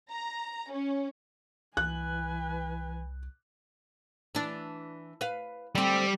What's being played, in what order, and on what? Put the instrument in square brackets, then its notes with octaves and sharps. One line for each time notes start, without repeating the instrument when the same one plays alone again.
[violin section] A#5
C#4
[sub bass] C2 [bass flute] E3 [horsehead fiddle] B4 G#5 [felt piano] F#6
[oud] E3 D4
B4 F5
[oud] D3 C4 [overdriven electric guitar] G3 G4